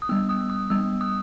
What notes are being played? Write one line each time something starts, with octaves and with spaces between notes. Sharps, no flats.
D#6
G3 B3 E6
D#6
D#6
G3 B3 E6
D#6